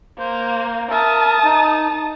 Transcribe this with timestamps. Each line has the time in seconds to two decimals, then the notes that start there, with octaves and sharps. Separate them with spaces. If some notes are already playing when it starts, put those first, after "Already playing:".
0.19 A#3 C5
0.90 A#4 E5 A5 D#6
1.44 D#4